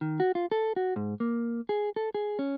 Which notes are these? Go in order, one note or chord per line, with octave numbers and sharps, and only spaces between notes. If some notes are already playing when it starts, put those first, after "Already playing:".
D#3
F#4
F4
A4
F#4
G#2
A#3
G#4
A4
G#4
C#4